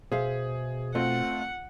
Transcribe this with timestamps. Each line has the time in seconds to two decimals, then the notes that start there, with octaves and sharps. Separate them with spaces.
0.12 B2 G#4 C5 E5 F5
0.95 A3 C4 F4 D#5 F#5